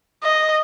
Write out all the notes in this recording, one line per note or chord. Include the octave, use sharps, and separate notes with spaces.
D#5